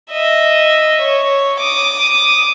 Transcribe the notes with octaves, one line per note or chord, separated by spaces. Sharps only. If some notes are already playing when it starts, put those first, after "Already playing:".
D#5 E5
C#5
D6 D#6